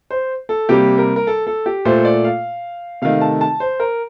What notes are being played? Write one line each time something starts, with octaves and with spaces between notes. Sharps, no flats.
C5
A4
C3 G3 A#3 G4
A#4
A#4
A4
A4
G4
A#2 A3 C5
D5
F5
C3 D#3 A3 F5
A5
A5
C5
A#4